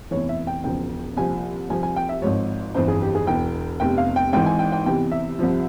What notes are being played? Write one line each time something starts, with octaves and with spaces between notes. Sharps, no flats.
F1 E2 E3 C#5
E5
G5
E1 E2 C#3 F3 G5
C2 A#2 F3 G#5
C2 C3 F3 G#5
G#5
G5
E5
G#1 G#2 F3 C#5
G1 F2 E3 C5
G#4
G4
G#4
E1 E2 E3 G5
F1 E2 C3 G5
F5
G5
G#1 G#2 E3 G5
G#5
G5
G5
E2 C3 E3 G5
E5
C2 C3 F3